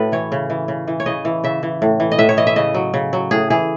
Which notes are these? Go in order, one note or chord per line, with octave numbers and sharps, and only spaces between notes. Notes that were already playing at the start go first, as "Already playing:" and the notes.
Already playing: A2 F#4 A4 B4
E3 C#5
C#3
E3
C#3
E3
C#5
C#3 D#5
E3
C#3 E5
E3
A2
E3
D#5
A2 E5
C#5
E3 D#5
E5
C#3 D#5
F#3
C#3
F#3
A2 G#4
E3 G#4